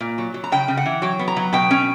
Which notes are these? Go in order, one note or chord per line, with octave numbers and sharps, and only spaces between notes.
A#2
F#3
F#3
A#5
C#3 G5
C#3
F#5
E3
F#3 G5
B3
A#5
F#3
B2 G5
C#4